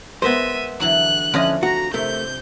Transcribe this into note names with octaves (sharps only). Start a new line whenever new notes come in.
G#3 B3 A#4 C5 E5 D#7
D3 E3 F#3 F#6
F2 D3 A3 C#4 F4 D#5
F#4 A#5
C3 A3 A#4 G6